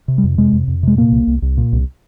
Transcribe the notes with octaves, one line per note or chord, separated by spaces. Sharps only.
C3
G3
F2
C3 G#3
F2
F2
C3 G#3
A#2 A#3
C2
C2
C2
A#2
C2